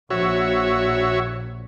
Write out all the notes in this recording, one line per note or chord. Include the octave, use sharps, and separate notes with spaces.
A#1 F#4 C#5 E5